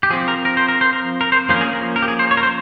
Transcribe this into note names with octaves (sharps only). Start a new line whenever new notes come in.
G4
F3 C4 G#4
A#4
A#4
C5
A#4
C5
A#4
A#4
C5
F3 A#3 C#4 C5
A#4
G#4
A#4
A#4
G4
G#4
C5
C#5
A#4
C5